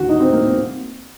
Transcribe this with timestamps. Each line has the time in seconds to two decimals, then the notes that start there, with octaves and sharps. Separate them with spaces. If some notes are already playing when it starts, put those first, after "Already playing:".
Already playing: D#2 D3 F#4
0.09 D#4
0.20 C4
0.33 A#3
0.44 C4